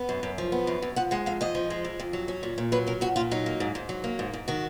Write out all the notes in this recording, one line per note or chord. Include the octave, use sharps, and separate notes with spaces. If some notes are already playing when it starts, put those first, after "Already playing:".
Already playing: B3
F#2
F#2
F3
B3
F#2
F#2
F3 F#5
G#3 F#5
F2 F5
F2 D#5
F3
G#3
F2
F2
F#3
C#4
A#2
A#2
F#3 B4
C#4 A#4
A#2 F#4
A#2 F4
F#3 D#4
A#3
G#2
G#2
F#3
A#3
G#2
G#2
D#3 F#4